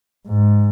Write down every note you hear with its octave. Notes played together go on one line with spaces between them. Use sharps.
G#2